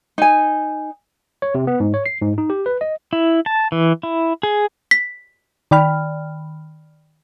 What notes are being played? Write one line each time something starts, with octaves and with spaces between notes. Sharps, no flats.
D#4 G#5
C#5
C3
B3
G#2
C#5
C7
G#2
D#4
G4
B4
D#5
E4
A5
E3
E4
G#4
B6
D#3 D5 G5 B5 F6